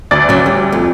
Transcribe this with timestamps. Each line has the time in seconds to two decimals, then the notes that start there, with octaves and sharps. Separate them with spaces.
0.11 D2 D5 A6
0.29 C#3 F#3
0.46 G3
0.72 F2